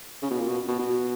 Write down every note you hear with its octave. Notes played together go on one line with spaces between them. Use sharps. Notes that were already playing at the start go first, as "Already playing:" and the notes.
C#3
B2
A#2
B2
B2
B2